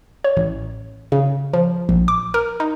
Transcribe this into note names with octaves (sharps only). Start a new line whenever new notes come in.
C#5
A1
C#3
F3
A#1
D6
A#4
D#4